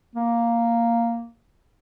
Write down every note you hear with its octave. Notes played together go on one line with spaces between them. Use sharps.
A#3